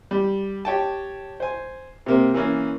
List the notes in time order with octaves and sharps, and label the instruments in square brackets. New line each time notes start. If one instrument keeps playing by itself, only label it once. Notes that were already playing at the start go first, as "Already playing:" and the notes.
[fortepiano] G3
G4 C#5 G5 A5
C5 G#5
C3 A#3 C4
E3 A#3 C#4